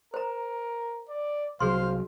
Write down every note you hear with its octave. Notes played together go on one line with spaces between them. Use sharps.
A#4 C5 A#5
D5
C2 F#3 G#4 C5 F5 C6